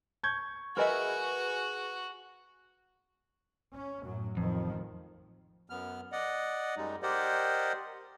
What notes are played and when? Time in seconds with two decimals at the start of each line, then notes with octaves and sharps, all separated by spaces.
0.23 C#6 G6 G#6
0.77 F#4 G#4 A#4 B4 D#5 E5 G#5
3.73 C#4
4.05 F#2 A2 F#3
4.37 A1 F2 D#3 F3
5.70 F#2 B3 F6
6.12 D5 D#5 F#5
6.77 F#2 G3 G#3 D#4
7.03 G4 A#4 C5 D5 D#5 F#5